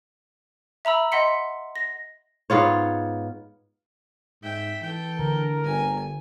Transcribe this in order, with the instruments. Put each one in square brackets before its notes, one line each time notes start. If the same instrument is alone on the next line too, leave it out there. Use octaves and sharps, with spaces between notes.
[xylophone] E5 A#5 B5 E6
D#5 F#5 C6 B6 C#7
A#6
[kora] G#2 B3 F4 C#5
[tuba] G#2 [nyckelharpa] E5 G5
[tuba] E3 [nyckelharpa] A4 G5
[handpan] D3 [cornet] A#4
[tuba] G1 [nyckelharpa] G#5